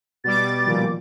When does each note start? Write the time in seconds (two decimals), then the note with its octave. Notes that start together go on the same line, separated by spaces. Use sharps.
0.24 B2 G3 D6 A6
0.67 A#2 D#3 F3 A#3